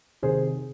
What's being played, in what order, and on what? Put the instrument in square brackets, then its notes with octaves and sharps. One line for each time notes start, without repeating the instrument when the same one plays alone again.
[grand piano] C3 D#3 G#4 C5